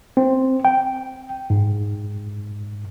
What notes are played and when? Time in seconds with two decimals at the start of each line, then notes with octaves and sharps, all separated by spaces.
0.17 C4
0.65 G5
1.50 G#2